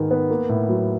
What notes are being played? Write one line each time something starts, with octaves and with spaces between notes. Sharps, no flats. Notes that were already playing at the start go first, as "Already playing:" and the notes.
Already playing: G#2 D#3 G#3 B3
B3
A#3
A2
F#3